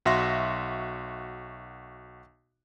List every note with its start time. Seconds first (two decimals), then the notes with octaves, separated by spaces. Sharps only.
0.06 B1 F#4 E5 F#5 C6 A#6